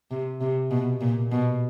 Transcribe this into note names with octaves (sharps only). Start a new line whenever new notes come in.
C3
C3
B2
A#2
B2